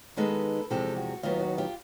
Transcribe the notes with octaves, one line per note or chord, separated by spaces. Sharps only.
D#3 G#3 B3 D#4 A4 B4
E2 C3 F3 G#3 G4 A4
F#4
D#2 D#3 F#3 B3 F4
F#4
F4 G4